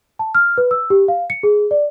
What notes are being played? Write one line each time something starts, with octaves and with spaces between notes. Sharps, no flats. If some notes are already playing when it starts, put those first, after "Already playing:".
A5
F6
B4
E6
G4
F5
C#7
G#4
D5